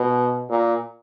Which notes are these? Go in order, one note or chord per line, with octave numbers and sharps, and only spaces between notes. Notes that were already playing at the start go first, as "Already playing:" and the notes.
Already playing: B2
A#2